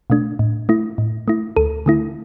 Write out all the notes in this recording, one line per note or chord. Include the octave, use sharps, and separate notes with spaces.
B2 A3 D4
A2
A3 E4
A2
A3 E4
D2 A4
D3 A3 E4